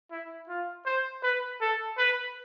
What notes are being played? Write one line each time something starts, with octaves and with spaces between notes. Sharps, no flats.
E4
F4
C5
B4
A4
B4